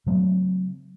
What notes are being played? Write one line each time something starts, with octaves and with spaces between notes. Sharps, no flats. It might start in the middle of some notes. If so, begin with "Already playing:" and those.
C#3 F#3 A3 C4